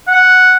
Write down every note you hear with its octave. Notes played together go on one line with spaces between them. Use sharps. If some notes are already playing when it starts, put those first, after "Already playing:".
F#5